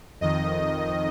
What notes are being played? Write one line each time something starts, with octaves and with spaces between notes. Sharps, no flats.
F2 D#3 D#5